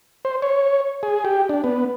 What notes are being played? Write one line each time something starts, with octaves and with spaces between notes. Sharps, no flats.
C5
C#5
G#4
G4
D4
B3